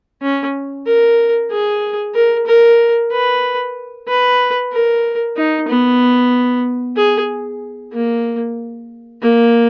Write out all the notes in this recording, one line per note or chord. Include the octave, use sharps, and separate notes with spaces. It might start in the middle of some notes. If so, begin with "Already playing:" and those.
C#4
A#4
G#4
A#4
A#4
B4
B4
A#4
D#4
B3
G#4
A#3
A#3